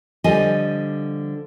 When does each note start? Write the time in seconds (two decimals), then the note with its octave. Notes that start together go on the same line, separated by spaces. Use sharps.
0.24 D3 F3 G3 D#5 G#5